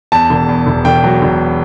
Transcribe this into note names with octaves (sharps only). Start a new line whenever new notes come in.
E2 A5
E1
E2
E1
E1 G5
F#3
E1